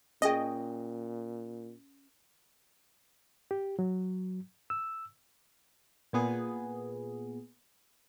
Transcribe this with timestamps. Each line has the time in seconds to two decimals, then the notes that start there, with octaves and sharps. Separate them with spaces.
0.22 A#2 C#4 G#4 D#5 G5
3.51 G4
3.79 F#3
4.70 E6
6.13 A#2 B3 G#4